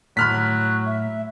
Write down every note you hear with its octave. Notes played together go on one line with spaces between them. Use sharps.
A2 F#3 B5 F6 F#6 B6
E5